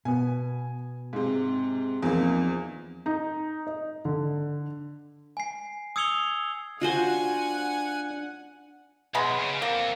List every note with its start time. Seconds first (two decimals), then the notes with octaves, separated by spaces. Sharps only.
0.05 B2 B3 G#5
1.13 G#2 C3
2.03 E2 F3 A#3 C4 D#4
3.06 D#4
3.67 D#5
4.05 D3
5.37 G#5 C7
5.96 D#6 E6 G#6 C#7 F7 G7
6.81 D4 F4 F#4 C5 F#5 G#5
9.15 B1 G#3 B3 B5
9.40 C#3
9.62 A#3 C4 A4